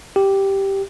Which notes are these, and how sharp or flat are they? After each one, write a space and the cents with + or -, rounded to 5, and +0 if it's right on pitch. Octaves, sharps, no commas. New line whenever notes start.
G4 -5